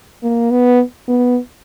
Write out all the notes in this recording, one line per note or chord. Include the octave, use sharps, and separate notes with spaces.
A#3
B3
B3